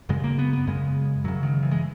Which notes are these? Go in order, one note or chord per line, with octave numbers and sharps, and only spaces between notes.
F#2 C#3 G#3
A#3
B3
B3
F#2 C#3 G#3
F#2 C#3 F#3
D#3
E3
G#3